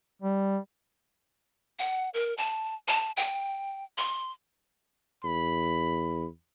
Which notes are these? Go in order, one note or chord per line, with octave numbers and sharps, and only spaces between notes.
G3
F#5
A#4
A5
A5
G5
C6
E2 B5